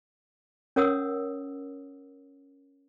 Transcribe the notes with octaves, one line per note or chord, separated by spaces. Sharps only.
C#4 A#4 C#5 F#5 D#6 E6